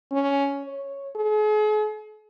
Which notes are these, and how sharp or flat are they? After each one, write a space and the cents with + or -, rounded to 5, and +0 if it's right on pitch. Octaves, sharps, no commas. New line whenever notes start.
C#4 +10
C#5 -5
G#4 +40